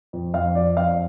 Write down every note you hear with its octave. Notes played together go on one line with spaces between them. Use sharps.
F2
F2 F5
F3 D5
F2 F5